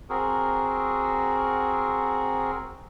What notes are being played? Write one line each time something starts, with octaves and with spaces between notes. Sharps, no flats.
C4 F#4 G#4 A#4